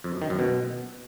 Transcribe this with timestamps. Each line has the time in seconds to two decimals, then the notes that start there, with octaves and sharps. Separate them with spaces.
0.04 F2
0.13 F#2
0.22 D#3
0.30 F#2
0.39 B2